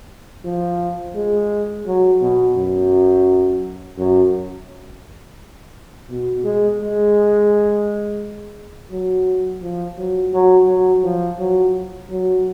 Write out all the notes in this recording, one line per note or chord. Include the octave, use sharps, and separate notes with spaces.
F3
G#3
F#3
B2
F#2
F#2
B2
G#3
G#3
F#3
F3
F#3
F#3
F#3
F3
F#3
F#3